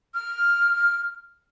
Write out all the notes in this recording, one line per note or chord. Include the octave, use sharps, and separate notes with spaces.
F6